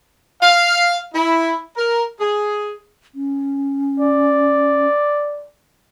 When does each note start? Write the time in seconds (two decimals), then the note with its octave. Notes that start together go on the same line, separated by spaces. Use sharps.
0.43 F5
1.14 E4
1.77 A#4
2.20 G#4
3.15 C#4
4.00 D5